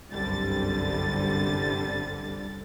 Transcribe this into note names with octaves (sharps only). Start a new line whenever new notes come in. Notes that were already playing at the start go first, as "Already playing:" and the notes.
G1 C2 F#2 D3 G3 A6